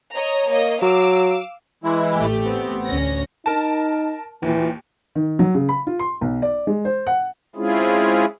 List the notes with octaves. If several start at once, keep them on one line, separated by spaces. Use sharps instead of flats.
C#5 D#5 A#5
A#3 C#5 D#5
F#3 F5 D6 E6
E3 G#3 E4
A1 A3 G4
B3 C4
D2 C#4 A#6
D#4 A#4 A5
D#2 A#2 E3
D#3
F#3
C#3
B5
F4
C6
B1
D5
G#3
C5
F#5
G#3 C4 C#4 E4 F4 G#4